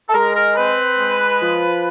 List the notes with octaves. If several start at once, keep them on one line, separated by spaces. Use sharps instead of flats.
A4
G#3 A#4
A#4
C4 B4
G#3
F3